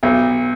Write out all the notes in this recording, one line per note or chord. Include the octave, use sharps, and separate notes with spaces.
B1